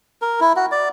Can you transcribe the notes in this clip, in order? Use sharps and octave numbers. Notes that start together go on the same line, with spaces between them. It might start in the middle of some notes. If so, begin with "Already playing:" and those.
A#4
E4
F#4
D5